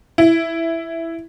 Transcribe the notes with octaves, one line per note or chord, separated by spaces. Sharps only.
E4